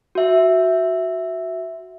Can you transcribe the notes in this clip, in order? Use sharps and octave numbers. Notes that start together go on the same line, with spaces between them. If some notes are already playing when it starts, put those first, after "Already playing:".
F#4 E5